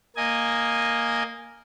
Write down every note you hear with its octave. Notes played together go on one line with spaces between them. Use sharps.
A#3 D#5 G#5